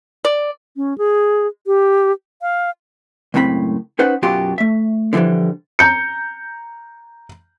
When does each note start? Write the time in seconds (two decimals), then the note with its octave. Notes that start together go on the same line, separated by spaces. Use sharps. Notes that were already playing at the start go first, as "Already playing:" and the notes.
0.25 D5
0.77 C#4
0.98 G#4
1.67 G4
2.42 F5
3.34 C#2 F#2 A2 C4 B5
3.99 C#4 D#4 B4 C5 F#5
4.23 F#2 B2 F#3 F4 G4 C6
4.58 A3 E5
5.13 D3 E3 F3 G3 E4
5.79 A#5 G6 C#7